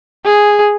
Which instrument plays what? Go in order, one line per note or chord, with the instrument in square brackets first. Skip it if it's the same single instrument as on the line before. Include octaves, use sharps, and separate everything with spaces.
[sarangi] G#4